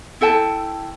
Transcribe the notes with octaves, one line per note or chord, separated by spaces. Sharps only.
E4 A4 G5 A5